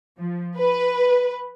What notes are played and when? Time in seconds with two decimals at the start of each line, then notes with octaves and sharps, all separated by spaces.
0.19 F3
0.57 B4